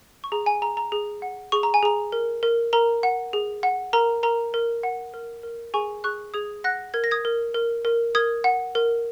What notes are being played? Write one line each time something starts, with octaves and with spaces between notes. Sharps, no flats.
C#6
G#4 A#5
G#5
G#4 A#5
A#5
G#4
F#5
G#4 C#6
A#5
G#5
G#4 A#5
A#4
A#4
A#4 A#5
F#5
G#4
F#5
A#4 A#5
A#4 A#5
A#4
F#5
A#4
A#4
G#4 G#5 C#6
G#4 C#6 F#6
G#4 D#6 G#6
F#5 F#6 A#6
A#4 G#6
A#6
D#6 G#6
A#4
A#4
A#4
A#4 D#6 G#6
F#5
A#4